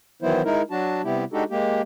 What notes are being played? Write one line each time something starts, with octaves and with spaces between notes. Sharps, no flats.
D#3 E3 F#3 B3 E4 C5
G#3 D#4 E4 A#4
F#3 D4 F#4 A5
C3 G3 B3 E4 G4
G#3 D4 D#4 F#4 G4 A4
G#3 A#3 G4